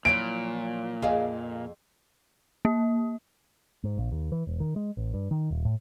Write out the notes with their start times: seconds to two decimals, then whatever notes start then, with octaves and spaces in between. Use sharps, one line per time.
0.05 A#2 F3 F#3 E4 D7
1.02 F2 G#4 D5 D#5 F5
2.65 A#3
3.84 G#2
3.98 A#1
4.12 D#2
4.32 E3
4.47 E1
4.60 D#3
4.76 G#3
4.97 A1
5.14 G2
5.31 D#3
5.50 D#1
5.65 A2